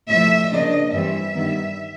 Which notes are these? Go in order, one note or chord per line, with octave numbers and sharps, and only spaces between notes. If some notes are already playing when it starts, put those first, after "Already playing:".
A2 F3 A3 E5
C#3 F3 A#3 D4 D#5
G2 E3 G3 C4 E5
G2 D#3 G3 B3